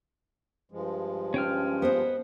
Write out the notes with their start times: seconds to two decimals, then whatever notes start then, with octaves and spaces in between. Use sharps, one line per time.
0.72 G2 F3 G#3
1.34 C#4 G5 F6
1.82 B3 C5 D#5